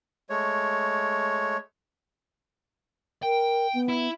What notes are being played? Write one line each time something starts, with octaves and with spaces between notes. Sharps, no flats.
G#3 A3 C#5
A#4 G5
B3
E4